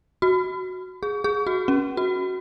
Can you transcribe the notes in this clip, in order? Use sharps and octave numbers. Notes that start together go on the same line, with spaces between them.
F#4
G#4
G#4
F#4
C#4
F#4